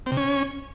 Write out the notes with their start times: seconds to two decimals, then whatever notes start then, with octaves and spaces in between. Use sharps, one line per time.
0.06 C4
0.12 C3
0.17 C#4